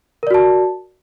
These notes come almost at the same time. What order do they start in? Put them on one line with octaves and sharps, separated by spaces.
A#4 D5 F#4 A5